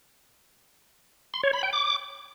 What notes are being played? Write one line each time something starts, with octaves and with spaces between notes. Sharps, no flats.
C6
C#5
B5
G5
D6